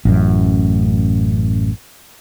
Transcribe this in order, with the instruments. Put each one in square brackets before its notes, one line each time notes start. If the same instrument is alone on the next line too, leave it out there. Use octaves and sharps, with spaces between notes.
[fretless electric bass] A1 F#2